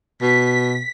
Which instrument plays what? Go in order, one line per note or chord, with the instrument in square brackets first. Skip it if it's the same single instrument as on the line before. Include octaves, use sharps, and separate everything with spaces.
[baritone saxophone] B2 [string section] B6